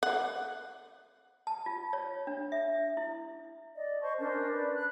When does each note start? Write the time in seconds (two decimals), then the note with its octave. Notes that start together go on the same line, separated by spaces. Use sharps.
0.03 F#5
1.47 A5
1.66 F4
1.93 C#5
2.27 D4
2.52 E5
2.97 E4
3.76 D5 D#5
4.02 C5 A5 C6 C#6
4.20 C#4 D4 A#4 C5
4.51 B4 D5
4.75 F#6